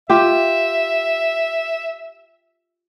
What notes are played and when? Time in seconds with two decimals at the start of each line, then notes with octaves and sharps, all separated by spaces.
0.10 F4 G4 E5